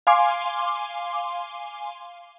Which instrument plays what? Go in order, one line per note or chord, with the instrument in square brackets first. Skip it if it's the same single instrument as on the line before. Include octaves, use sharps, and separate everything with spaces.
[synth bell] F5 G#5 C6 D6